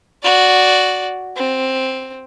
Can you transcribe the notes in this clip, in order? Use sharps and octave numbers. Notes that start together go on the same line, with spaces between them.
F#4 D5
C4